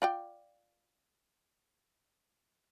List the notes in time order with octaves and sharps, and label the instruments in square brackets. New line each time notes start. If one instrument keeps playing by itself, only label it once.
[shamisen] F4 D5 G5